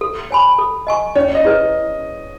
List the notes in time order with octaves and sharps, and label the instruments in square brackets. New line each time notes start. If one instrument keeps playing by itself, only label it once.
[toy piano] A4
C#5 G#5 B5
A4
D#5 G#5 C#6
[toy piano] C#4 [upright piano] C#5
[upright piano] D#5
[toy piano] E4 G#4 B4